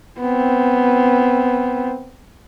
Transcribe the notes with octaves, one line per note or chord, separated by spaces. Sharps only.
B3 C4